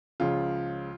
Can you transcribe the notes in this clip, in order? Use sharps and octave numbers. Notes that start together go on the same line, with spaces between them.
C#2 C#3 F3 F4